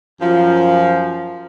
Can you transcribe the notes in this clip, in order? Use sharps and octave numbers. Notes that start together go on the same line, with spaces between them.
F#2 F3